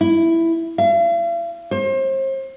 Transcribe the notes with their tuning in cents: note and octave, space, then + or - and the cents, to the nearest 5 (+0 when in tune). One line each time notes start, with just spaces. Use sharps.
E4 +5
F5 -45
C5 +35